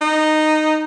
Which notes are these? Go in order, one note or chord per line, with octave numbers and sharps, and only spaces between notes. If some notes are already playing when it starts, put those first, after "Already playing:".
D#4